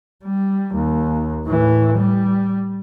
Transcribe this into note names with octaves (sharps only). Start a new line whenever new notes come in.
G3
D#2
A2 E3
G3